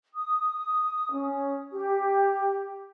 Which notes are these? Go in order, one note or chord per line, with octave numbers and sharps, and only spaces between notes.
D#6
C#4
G4